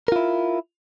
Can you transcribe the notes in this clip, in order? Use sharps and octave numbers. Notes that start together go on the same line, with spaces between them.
E4 F4 A#4